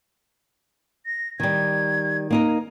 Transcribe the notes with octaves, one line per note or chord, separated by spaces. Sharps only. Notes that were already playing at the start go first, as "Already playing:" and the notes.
A#6
D#3 G3 G#6
A#3 D#4 A#4